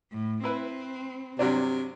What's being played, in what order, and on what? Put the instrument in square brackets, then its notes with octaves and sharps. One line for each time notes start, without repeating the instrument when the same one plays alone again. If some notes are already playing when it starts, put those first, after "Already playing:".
[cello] A2
[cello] C4 [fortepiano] E4 B4
[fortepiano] G2 F#3 D4 [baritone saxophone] C3